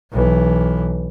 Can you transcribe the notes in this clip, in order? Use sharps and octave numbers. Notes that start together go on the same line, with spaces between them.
B1 E3